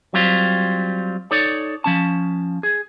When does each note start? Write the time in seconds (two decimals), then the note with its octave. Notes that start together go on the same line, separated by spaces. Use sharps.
0.14 F#3 G3 C4 F4
1.31 D#4 A4 C#5 D5
1.84 F3 C#4 A5
2.63 G#4